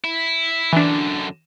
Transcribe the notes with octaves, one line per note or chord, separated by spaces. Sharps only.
E4
F#2 D3 E3 D4